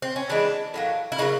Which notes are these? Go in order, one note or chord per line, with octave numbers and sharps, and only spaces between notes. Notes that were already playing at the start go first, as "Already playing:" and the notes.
C4
C#4
E3 G#3 B3 D4
A2 F#3 A#3
E4
C#3 F#3 A#3 D#4